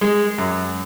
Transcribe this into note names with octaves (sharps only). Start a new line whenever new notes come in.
G#3
F#2